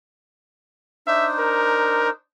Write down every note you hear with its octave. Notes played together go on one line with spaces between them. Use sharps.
D4 D#4 C5 E5
A#4